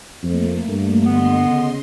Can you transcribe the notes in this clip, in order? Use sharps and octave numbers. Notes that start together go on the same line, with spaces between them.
F2 A3 A#3
G2
D3 B3 D#5 C6
C#3